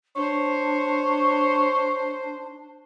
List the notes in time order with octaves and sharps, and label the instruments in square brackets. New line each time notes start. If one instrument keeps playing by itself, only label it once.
[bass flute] D4 [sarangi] C5 [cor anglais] C#5